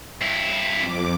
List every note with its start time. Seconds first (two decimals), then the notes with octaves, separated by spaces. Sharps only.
0.21 G2 E4
0.76 F2 D6